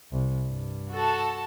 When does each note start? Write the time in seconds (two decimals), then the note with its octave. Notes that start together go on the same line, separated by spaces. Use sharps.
0.12 C2
0.47 G2
0.92 F#4 A4 A5